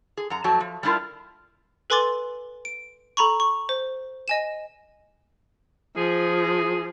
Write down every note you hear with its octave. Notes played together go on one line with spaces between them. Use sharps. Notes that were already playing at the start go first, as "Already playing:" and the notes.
G#4
F#2 F#5 A#5
F2 F#3 A3 F#4 A5
F3
G3 A3 D4 E4 F4 A#4
A4 B4 G#5 C6 D6 A6
D7
A4 A#5 B5 C#6
C#6
C5
D#5 G#5 E7
F3 G#4